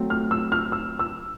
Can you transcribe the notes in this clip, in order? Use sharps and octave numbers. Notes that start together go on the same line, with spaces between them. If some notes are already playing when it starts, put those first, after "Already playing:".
Already playing: F#3 A3 C4
F6
E6
F6
E6
E6